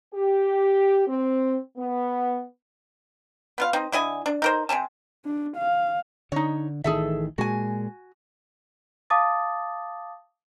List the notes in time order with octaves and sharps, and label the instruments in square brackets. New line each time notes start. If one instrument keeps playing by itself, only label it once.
[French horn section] G4
C4
B3
[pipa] B3 F4 F5
C4 D#4
D3 E4 D#5 G#5
D4
D#4 A#4 C5
C3 C4 G#5 A5
[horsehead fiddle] D4
F5
[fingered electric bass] D3 [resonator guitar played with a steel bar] D#4 C#5
[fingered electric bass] A1 D#3 E3 [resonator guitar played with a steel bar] G#4 A4 E5
[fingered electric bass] A#2 G#3 [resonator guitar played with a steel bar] F#4 G#5
[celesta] F5 A5 D6 D#6 A6